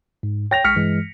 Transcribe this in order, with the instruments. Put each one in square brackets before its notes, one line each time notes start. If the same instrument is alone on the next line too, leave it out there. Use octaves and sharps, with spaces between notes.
[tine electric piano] G#2
[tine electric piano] C#5 [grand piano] G5 A#6 F7
[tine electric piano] A#1 G#3 C#6 [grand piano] F6 B6 C#7
[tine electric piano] G2 E3 G#3